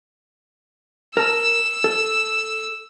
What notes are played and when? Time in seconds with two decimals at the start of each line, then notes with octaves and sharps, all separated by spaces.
1.17 A#4 A5 E6
1.84 A4